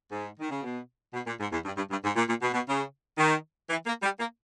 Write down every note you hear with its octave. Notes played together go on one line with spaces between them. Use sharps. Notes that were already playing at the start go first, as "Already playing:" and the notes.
G#2
D#3
C#3
B2
B2
A#2
G#2
E2
G2
G2
G2
G#2
A#2
A#2
B2
B2
C#3
D#3
E3
A#3
G3
A#3